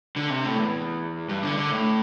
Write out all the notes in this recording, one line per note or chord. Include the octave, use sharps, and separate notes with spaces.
D3
C3
A2
E2
G2
D3
D3
A2